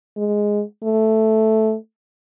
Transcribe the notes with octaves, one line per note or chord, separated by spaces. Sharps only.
G#3
A3